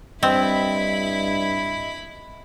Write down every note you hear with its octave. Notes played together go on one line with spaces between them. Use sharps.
G2 C4 E4 D#5 B5